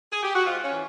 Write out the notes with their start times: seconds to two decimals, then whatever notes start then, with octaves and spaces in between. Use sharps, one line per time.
0.12 G#4
0.23 G4
0.35 F#4
0.46 G#2 F4
0.63 C#4
0.72 E3